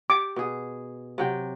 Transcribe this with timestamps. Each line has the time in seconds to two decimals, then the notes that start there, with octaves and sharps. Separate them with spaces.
0.10 G4 D6
0.36 B2 G#4
1.18 C3 F#3 G5